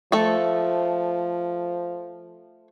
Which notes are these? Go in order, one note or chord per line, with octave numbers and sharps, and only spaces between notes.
F3 A3 A4